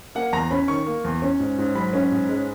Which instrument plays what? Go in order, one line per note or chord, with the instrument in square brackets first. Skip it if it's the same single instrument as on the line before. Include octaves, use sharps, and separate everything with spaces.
[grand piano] A#3 F#5
E2 A#5
C#4 B5
D#3 C#6
A#3
E2
C#4
G#2
G#2
F#3 B5
C#4
G#2
G#3